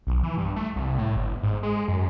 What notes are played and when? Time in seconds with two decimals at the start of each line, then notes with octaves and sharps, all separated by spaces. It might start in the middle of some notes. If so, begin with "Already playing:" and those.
0.07 B1
0.23 E3
0.37 G2
0.56 A3
0.76 C2
0.98 A2
1.16 G1
1.43 G#2
1.63 G#3
1.88 F#2